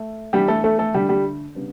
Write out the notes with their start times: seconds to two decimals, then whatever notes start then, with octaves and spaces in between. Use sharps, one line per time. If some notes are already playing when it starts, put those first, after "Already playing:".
Already playing: A3 A4
0.33 E3 G3 B3 D4 G4
0.48 A3 A4
0.64 A3 A4
0.79 A3 A4
0.94 D3 G3 A3 D4 G4
1.09 G3 G4
1.55 C#3 G3 B3 D4